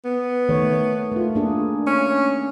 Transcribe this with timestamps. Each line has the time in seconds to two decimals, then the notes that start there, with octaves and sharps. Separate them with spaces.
0.05 B3
0.49 D#3 A3 C#5
1.12 A3 F4
1.35 A#3 D4 G#4
1.87 C#4